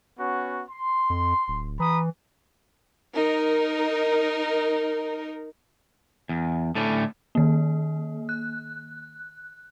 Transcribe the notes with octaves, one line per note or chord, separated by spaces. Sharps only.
B3 C#4 F#4
C6
F2
D1
E3 A#5 B5 D#6
D#4 A#4
E2
A2 D3 A3 C#4
D#3 A#3
F#6